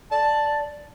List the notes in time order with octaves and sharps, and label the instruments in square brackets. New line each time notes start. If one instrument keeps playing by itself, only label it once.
[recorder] D5 [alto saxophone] A5